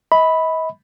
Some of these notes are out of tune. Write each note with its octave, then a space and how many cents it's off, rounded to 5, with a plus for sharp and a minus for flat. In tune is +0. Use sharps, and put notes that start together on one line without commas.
D#5 +40 B5 +0